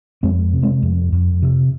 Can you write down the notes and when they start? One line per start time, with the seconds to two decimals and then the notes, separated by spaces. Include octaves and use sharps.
0.23 F2 G#3 C4
0.53 C3
0.63 G#3 C4
0.83 F2
1.12 F2
1.42 C3